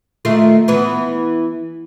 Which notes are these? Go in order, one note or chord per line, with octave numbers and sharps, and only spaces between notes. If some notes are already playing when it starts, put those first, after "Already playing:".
D#3 A3 F4
E3 B3